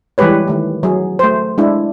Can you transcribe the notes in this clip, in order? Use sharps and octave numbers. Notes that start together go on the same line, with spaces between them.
E3 G3 G#3 G4 B4 C#5
D#3 A3
F#3 G#4
A3 C5
G#3 D4 E4